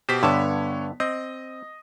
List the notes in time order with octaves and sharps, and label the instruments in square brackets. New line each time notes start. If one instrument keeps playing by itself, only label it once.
[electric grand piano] B2 G4 B6 [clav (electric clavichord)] C5
[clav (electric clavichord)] G2 D3 A5 [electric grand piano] B3 C#5
[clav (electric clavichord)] C4 [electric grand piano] D#5